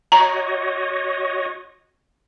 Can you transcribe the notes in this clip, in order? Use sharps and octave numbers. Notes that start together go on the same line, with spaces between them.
F#4 C#5 D#5 A#5